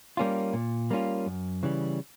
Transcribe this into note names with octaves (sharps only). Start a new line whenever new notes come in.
G3 A#3 C#4 F4
A#2
G3 A#3 C#4 F4
F#2
C#3 E3 G3